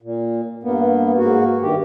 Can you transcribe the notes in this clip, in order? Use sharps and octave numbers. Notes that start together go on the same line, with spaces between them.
A#2
G2 A#3 B3
G#2 A#3 F#4
G2 D#3 G4